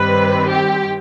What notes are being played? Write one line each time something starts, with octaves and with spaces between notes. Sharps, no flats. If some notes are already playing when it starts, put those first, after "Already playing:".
Already playing: G2 D#3 G3 C4 B4
G4